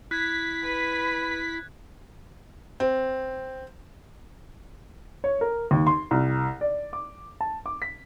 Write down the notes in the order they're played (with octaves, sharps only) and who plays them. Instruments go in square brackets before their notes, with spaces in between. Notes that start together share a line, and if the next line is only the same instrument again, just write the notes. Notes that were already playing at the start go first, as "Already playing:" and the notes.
[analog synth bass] E4 [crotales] F#6 G#6 [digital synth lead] B6
[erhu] B4
[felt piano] C4
[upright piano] C#5
A#4
D#2
C6
C2
D5
D6
A5
D6
B6